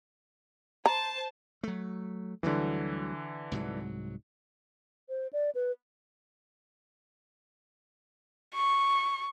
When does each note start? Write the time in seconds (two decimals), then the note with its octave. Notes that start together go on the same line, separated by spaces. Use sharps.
0.86 C5 A5 A#5
1.63 F#3 A3
2.43 D2 D3 E3 F#3 G3
3.52 C2 G#2 F#3
5.09 C5
5.33 D5
5.55 B4
8.55 C#6